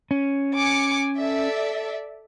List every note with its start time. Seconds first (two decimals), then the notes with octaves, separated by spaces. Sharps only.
0.11 C#4
0.58 G#5 D6 C#7
1.19 A4 D5 E5